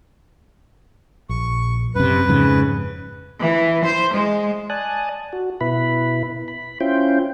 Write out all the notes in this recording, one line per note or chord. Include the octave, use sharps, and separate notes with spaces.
A#1 C#6
F#2 C3 B4
F2 G#2 C#3
E3
C5
G#3
D5 G#5 A5 D#6 F#6
F#4
B2 E4 B4 B5
B5
C#4 E4 F4 C5 G5